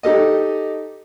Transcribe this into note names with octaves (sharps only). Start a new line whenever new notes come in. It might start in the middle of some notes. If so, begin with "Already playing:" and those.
D#4 G4 A4 D#5